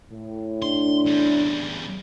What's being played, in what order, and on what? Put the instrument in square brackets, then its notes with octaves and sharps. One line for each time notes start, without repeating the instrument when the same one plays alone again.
[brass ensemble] A2
[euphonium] D4 [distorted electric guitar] C6
[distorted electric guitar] E2 G3